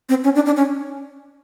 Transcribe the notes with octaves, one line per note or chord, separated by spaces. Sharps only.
C4
C#4
D4
D4
C#4